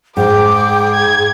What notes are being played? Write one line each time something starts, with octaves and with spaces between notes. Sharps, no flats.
G#2 G#4 G5 D6
G#6